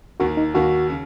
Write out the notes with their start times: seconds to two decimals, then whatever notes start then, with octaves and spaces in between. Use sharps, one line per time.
0.20 D#2 D#3 A#3 F#4
0.37 D#4
0.55 D#2 D#3 A#3 F#4
0.90 C#3